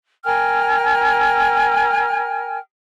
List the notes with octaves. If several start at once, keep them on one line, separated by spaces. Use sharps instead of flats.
A#4 G5 G#5 F6